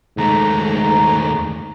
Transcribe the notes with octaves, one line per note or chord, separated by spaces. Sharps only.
D#2 G#2 A3 A#5